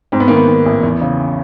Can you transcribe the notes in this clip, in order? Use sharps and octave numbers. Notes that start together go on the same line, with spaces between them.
G#2 C4
B3
D#3 A#3
B3
D#3
A1
E2
C#3